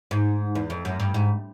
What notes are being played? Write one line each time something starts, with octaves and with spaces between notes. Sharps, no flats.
G#2
E2
F2
F#2
G2
G#2